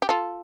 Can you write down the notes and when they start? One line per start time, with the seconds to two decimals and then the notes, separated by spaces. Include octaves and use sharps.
0.02 G4
0.09 F4 A4